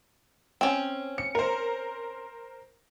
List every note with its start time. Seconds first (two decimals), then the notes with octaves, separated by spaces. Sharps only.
0.61 C4 C#4
1.18 C#7
1.35 A#4 C5